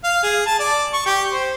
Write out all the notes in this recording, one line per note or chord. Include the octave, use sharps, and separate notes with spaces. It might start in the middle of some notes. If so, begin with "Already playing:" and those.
F5
G#4
A5
D5
C#6
G4
C5